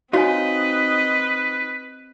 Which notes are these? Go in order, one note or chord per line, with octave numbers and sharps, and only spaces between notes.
C4 D#4 F4 F#4 B4 C#5 D#5 G#5